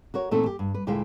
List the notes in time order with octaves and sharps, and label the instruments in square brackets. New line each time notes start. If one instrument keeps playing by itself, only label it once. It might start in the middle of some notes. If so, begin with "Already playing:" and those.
[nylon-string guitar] F#4 A#4 C#5
A#2 E3 A3 C4 D#4 A4
G4
G2
B4
D2 A#2 G#3 A#3 E4 G5